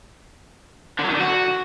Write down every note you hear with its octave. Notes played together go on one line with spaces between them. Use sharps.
D3
F#3
D#3
D3
F#4